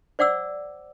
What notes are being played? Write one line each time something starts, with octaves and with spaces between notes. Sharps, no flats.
C5 D5 F#5 D6 E6